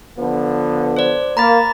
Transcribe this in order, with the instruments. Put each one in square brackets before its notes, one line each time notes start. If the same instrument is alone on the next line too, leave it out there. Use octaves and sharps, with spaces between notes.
[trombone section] D3 F3 B3
[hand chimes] C5 D5
[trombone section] A#3 [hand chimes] A#5 B5 A6